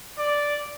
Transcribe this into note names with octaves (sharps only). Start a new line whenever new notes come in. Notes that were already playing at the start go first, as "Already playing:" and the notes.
D5